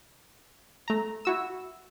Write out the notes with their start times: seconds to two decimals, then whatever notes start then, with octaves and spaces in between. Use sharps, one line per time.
0.88 A3 A#5
1.25 E4 F#4 E6